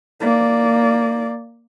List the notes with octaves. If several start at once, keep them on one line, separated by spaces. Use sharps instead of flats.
A#3 D5